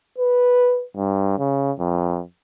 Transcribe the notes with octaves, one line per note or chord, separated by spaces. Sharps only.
B4
G2
C#3
F2